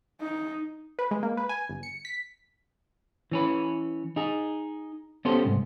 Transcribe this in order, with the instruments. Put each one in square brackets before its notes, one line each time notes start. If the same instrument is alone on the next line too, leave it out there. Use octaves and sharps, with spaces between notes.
[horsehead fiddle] D#4
[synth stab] B4
G#3
A#3
B4
G#5
G1
C#7
B6
[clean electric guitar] E3 C#4 B4
D#4 G#4
B3 C#4 G4 A4 C5
C2 G#2